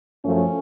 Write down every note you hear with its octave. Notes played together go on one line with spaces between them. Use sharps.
F#2 F3 A3 C#4